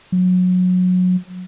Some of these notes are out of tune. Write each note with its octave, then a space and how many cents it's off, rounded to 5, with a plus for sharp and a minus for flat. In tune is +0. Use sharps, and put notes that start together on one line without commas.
F#3 -25